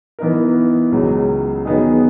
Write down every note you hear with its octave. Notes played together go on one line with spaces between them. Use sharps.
E3 B3 D#4 A#4
C#2 C#3 F#3
D#3 F#3 B3 D#4 G#4